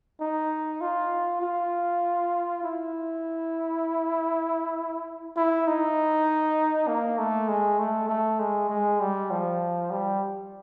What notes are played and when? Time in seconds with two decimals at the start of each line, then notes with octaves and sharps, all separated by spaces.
0.20 D#4
0.81 F4
1.42 F4
2.64 E4
5.37 E4
5.67 D#4
6.88 A#3
7.18 A3
7.49 G#3
7.79 A3
8.09 A3
8.39 G#3
8.70 G#3
9.00 G3
9.31 F3
9.91 G3